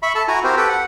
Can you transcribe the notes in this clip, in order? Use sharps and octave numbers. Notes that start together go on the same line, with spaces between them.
E5 B5 C#6
A4 A5
E4 F#4 G#5 A#5
C4 F#4 G4 A#4 C5
G4 A4 B4 G5
F#5